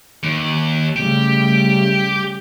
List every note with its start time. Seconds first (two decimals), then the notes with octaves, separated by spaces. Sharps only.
0.23 D#2
0.96 C#3 G3 A3 G4